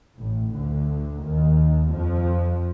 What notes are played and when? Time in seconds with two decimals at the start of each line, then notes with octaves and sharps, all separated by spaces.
0.18 A1 A2
0.54 D2 D3
1.24 D#2 D#3
1.94 F2 F3